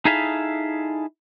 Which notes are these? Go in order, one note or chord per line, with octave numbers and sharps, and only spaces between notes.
D#4 E4 G#4 A4 E5 F5